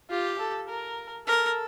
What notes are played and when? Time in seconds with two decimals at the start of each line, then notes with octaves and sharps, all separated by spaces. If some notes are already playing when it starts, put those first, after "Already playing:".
0.10 F4 G4
0.39 A4
0.69 A#4
1.27 A4 A#4